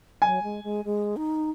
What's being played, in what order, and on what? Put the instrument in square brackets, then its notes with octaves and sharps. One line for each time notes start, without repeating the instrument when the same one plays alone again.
[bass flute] F#3 [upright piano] G#5
[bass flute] G#3
G#3
G#3
D#4